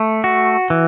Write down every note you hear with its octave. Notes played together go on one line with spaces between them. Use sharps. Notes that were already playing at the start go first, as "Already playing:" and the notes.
Already playing: A3
F#4
E3